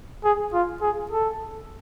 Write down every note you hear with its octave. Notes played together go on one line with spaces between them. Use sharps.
G#4
F4
G#4
A4